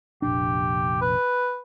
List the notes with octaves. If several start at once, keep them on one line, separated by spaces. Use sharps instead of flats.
F1 A#1 D4 G4
B4